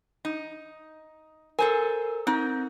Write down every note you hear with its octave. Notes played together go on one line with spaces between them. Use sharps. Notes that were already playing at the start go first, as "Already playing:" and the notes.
D#4
A4 A#4 C5 G#5
C4 D#4